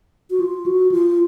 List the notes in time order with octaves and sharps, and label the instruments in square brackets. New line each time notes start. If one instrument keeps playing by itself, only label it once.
[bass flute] F#4
F4
F#4
F4